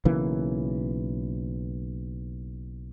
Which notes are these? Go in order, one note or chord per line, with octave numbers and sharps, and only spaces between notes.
B1 C#3 E3 A#3